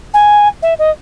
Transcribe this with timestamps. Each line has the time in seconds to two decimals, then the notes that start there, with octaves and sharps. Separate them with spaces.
0.14 G#5
0.62 E5
0.79 D#5